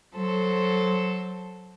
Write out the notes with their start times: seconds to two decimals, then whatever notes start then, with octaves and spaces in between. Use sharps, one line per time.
0.15 F#3 A4 C5